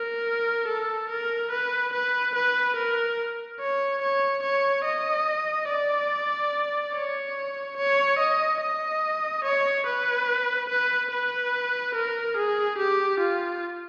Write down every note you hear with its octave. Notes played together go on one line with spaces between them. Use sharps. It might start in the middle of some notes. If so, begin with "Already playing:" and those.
Already playing: A#4
A4
A#4
B4
B4
B4
A#4
C#5
C#5
C#5
D#5
D5
C#5
C#5
D#5
D#5
C#5
B4
B4
B4
A#4
G#4
G4
F4